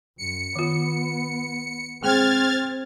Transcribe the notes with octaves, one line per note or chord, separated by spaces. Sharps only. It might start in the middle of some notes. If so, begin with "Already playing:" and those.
F#2 C#7
D#3 B3 F4
G#3 C4 G#4 G5 F6 G#6 A6